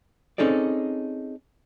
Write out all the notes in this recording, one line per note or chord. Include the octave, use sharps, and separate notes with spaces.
C4 C#4 D#4 G#4 A4 D5